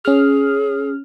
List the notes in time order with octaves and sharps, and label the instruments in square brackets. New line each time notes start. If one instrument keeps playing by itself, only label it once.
[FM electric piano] C#4 F6 [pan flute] G#4